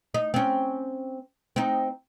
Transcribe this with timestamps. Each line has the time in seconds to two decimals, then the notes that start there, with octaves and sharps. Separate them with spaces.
0.14 D#4
0.34 C4 C#4
1.56 C4 D#4